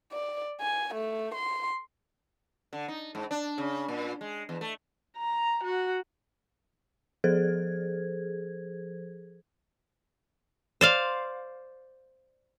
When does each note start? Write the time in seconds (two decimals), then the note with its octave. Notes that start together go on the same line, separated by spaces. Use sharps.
0.12 D5
0.61 G#5
0.94 A3
1.34 C6
2.73 D3
2.88 D#4
3.15 G#2
3.31 D4
3.58 C#3
3.88 A#2
4.21 G#3
4.49 E2
4.61 A3
5.18 A#5
5.64 F#4
7.24 F3 G#4 A4 C5 G#6
10.81 C5 D5 F5